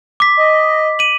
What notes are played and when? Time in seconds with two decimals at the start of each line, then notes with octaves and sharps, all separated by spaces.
0.20 D6 B6
0.37 D#5
0.99 D#7 F#7